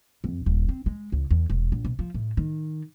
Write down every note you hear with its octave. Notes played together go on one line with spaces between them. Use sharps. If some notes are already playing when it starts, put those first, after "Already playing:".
F2
D#1
C4
G#3
C#2
E2
E1
A#1
B2
F3
A2
D#3